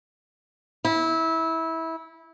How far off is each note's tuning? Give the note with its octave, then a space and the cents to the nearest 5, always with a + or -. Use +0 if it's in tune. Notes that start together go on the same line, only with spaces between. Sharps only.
E4 -20